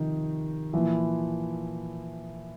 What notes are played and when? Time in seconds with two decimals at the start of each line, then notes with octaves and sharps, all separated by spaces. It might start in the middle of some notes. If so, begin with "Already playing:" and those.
Already playing: C3 D#3 F3 D#4
0.73 A#2 E3 F3 E4